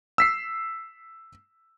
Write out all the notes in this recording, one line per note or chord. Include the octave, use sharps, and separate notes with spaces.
E6 B6 C7